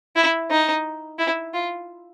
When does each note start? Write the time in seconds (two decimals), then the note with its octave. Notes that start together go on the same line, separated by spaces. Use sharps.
0.16 E4
0.51 D#4
1.18 E4
1.54 F4